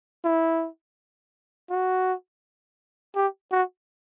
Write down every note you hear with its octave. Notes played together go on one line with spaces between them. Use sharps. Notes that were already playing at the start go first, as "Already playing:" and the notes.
E4
F#4
G4
F#4